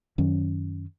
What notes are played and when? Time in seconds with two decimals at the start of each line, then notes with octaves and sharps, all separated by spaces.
0.18 F#2 D#3 F#3 C#4